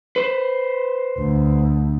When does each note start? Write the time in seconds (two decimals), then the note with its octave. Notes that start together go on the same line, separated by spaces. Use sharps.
0.16 B4 C5
1.18 D2